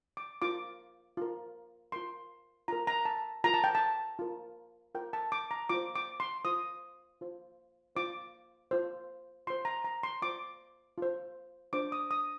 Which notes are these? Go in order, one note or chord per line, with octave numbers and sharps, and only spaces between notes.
D6
F4 A#4 D6
F4 A#4
F4 A#4 C6
F4 A#4 A#5
A#5
A5
F4 A#4 A#5
A5
G5
A5
F4 A#4
F4 A#4 G5
A5
D6
A#5
F4 C5 D6
D6
C6
F4 C5 D#6
F4 C5
F4 C5 D6
F4 C5
F4 C5 C6
A#5
A#5
C6
F4 C5 D6
F4 C5
D4 F4 C5 D6
D#6
D#6